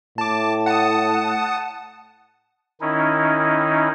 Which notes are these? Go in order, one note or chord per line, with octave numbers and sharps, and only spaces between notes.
A2 A5 D6
F#5 A5 D#6
D#3 C#4 D#4 E4